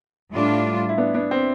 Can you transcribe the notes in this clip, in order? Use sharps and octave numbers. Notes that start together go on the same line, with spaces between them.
A2 G3 D4 F4
E4
B3 D4
B3 D4
C4